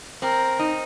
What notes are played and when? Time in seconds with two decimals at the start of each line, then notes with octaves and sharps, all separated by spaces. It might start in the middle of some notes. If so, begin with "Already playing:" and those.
0.22 C4 A#4
0.59 D#4